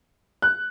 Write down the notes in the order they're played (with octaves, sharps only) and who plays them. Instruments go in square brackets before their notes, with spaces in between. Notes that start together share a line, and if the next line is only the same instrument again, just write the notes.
[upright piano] F#6